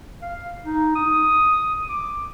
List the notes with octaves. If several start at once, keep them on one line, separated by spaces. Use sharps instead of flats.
F5
D#4
D#6
D6